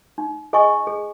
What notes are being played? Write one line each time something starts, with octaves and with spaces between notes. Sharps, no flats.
D#4
G#4 D#5 G#5 C#6
G#4